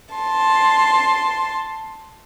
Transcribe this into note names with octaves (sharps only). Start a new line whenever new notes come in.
A5 C6